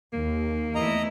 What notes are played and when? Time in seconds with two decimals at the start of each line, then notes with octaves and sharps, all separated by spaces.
0.13 D#2 A#3
0.75 E2 A3 E4 D#5 A#5